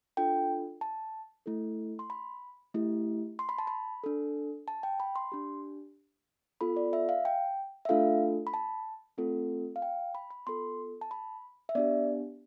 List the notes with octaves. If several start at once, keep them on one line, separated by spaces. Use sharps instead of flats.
D4 F4 A4 G5
A5
A3 E4 A4
C6
B5
A3 E4 G4
C6
B5
A5
B5
D4 A4
A5
G5
B5
C6
D4 G4
B3 F4 A4 B5
D5
E5
F5
G5
E5
A3 D4 F4 A4 F5
B5
A5
A3 C4 F4 A4
F5
G5
B5
B5
B3 F4 A4 C6
A5
B5
E5
B3 D4 G4 D5